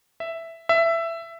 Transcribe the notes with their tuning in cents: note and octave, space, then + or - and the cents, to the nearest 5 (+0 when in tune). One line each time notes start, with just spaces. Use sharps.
E5 +5
E5 +15